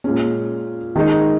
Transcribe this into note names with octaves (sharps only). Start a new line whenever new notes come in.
A#2 G#3 C#4
D#3 G#3 D#4